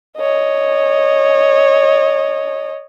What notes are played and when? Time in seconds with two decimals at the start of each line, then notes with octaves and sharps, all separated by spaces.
0.17 C#5 D#5